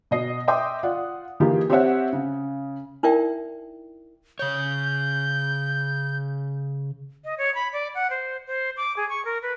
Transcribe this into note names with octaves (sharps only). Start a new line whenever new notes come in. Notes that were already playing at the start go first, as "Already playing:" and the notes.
B2 D#5 C7
D#5 E5 G5 C6 D6 D#6
F4 D5 F#5
E3 A#3 D#4 F4 G4 G#4
C4 G4 C5 C#5 E5 F#5
C#3
D#4 E4 A#4 D5 E5 G5
C#3 C#5 G6
D#5
C#5
B5
D5
F#5
C5
C5
D6
G#4
C#6
A#4
B4